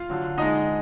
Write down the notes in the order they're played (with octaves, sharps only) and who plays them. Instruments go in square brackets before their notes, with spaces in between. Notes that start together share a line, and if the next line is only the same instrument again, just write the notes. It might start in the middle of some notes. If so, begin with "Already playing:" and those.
Already playing: [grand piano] F4 F5
D3 F#3
D3 G#3 D#4 D#5